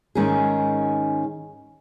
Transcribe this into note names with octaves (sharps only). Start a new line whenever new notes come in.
G#2 D#3 G#3 C#4 G#4